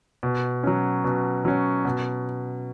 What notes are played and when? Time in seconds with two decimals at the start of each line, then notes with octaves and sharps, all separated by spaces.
0.23 B2
0.63 F#3 C#4
1.04 B2
1.45 F#3 C#4
1.85 B2